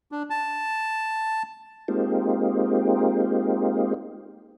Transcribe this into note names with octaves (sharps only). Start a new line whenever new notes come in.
D4
A5
G#3 A#3 C4 D#4 F4 G4